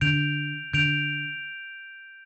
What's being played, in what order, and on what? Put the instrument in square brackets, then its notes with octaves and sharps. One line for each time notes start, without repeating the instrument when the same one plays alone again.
[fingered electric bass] D3 [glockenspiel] G6 D7 F7
[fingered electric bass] D3 [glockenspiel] G6 D7 F7